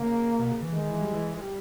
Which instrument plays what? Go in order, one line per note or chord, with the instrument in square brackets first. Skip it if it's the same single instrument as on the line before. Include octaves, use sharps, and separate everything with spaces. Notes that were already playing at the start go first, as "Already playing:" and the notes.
Already playing: [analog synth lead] C#3 [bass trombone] A#3
[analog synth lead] B2
C#3
E3
[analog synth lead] D#3 [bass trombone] G#3
[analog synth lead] E3
G3
E3
G#3
G3